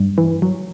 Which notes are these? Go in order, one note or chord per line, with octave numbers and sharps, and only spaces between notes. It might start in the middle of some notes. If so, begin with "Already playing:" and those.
Already playing: G2
E3
F#3